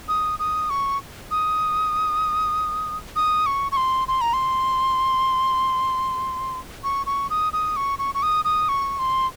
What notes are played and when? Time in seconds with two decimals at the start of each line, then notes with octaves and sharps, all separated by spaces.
0.09 D#6
0.39 D#6
0.70 C#6
1.31 D#6
3.16 D#6
3.46 C#6
3.72 C#6
3.77 C6
4.08 C6
4.21 A#5
4.33 C6
6.84 C#6
7.06 C#6
7.30 D#6
7.53 D#6
7.76 C#6
7.99 C#6
8.15 C#6
8.23 D#6
8.45 D#6
8.69 C#6
8.99 C6